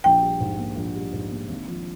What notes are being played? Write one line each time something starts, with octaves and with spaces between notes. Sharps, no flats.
A#1 G5
G3
G#2
A#3
A#1
G3
G#2
A#3
G#1
F3